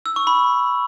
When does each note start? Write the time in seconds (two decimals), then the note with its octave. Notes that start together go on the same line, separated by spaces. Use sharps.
0.06 E6
0.16 C#6
0.27 B5